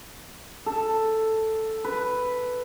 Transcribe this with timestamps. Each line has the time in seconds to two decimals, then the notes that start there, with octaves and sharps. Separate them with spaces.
0.66 A4
1.84 B4